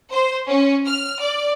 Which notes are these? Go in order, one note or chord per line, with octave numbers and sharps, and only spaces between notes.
C5
C#4
F6
D5